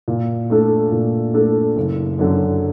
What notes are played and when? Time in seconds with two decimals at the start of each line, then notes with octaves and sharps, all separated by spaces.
0.08 A#2
0.50 A3 D4 A4
0.92 A#2
1.34 A3 D4 A4
1.76 F#1
2.19 F#2 D3